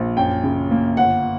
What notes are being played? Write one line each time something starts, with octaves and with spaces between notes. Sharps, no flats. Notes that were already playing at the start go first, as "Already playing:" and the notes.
Already playing: A#1
F#2 G5
C#3
A#3
G1 F#5